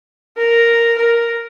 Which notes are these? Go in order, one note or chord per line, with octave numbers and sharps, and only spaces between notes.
A#4
A#4